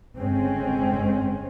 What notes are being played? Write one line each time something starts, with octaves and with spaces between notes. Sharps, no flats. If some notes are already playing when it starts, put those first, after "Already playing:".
G1 C#3 G#3 C4 C#4